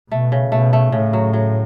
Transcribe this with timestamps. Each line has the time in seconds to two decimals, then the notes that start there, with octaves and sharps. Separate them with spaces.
0.11 B2 A3
0.32 C#3
0.51 B2 A3
0.73 A3
0.92 A2 C#3
1.13 F#3
1.33 F#3